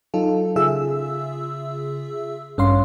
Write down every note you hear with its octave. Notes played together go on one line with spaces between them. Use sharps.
F#3 D#4 F4 A4
C#3 F4 G#4 E5 E6
A1 G2 C#4 C#5 F5 C6